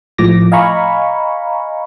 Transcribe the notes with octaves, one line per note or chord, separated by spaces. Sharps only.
A2 F3 D6 A#6
D#5 F5 G#5 A#5 B5 C#6